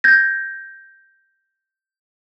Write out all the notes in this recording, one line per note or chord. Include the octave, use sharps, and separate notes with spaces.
G6 G#6 A#6